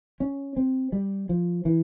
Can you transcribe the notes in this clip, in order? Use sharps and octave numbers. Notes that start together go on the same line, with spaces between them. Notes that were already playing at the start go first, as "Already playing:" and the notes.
C#4
C4
G3
F3
E3